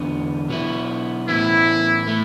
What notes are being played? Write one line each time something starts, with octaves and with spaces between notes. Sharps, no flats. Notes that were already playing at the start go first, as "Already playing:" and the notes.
Already playing: E2 D3 B3
B2 F#3 B3 E4
A2 E3 B3 E4
A2 A3 E4